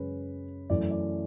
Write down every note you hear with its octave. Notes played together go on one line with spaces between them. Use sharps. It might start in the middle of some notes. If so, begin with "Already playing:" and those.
Already playing: F#2 C#3 G#3 C#4 B4
F#2 E3 A3 D5
D5